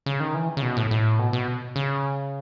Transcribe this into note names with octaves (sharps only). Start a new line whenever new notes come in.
C#3
D#3
E3
C#3
B2
A2
A2
B2
B2
C#3